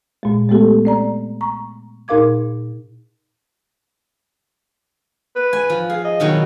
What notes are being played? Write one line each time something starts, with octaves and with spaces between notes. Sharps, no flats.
A#2 G#3
G#3 A3 B3 G4 A4
C4 D5 A#5
A#5 C#6
A#2 D#4 A#4 F5 D6 G#6
B4
G#5
F3
G#4 F5
D#5
B2 D#3 F#3